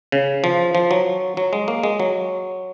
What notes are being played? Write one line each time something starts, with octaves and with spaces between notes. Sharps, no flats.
C#3
F3
F3
F#3
F#3
G#3
A#3
G#3
F#3